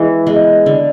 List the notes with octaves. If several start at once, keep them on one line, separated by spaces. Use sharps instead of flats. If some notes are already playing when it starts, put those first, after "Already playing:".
Already playing: E3 G#3 B3
G#3 B3
D3